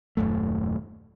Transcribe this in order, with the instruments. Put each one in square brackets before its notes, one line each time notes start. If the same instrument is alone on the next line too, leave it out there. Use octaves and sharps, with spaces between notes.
[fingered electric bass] D#1 F#2 A3